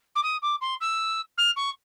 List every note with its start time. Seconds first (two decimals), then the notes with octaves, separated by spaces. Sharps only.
0.15 D6
0.23 D#6
0.42 D6
0.61 C6
0.80 E6
1.37 F6
1.56 C#6